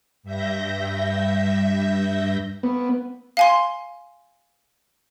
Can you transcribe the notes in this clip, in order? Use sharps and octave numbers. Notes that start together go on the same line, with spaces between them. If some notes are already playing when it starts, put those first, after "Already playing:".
G2 E5 G6 A#6
B3
F5 G#5 C6